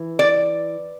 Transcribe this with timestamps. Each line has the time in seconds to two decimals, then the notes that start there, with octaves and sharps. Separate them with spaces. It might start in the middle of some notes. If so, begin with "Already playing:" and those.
Already playing: E3
0.19 D5